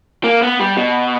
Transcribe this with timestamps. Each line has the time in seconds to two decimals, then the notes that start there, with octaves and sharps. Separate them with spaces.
0.24 A#3
0.42 B3
0.59 G3
0.77 B2